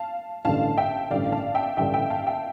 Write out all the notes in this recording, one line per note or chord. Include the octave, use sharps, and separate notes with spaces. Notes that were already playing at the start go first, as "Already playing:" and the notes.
Already playing: F5 A5
A1 G2 D3 F5 A5
E5 G5
A1 G2 D3 D5 F5
F5 A5
E5 G5
A1 G2 D3 E5 G5
E5 G5
F5 A5
E5 G5